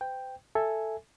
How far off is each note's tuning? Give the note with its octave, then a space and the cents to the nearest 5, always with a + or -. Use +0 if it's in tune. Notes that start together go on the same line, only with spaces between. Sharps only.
C5 -40 G5 +0
A4 +0 E5 +0 G#5 +0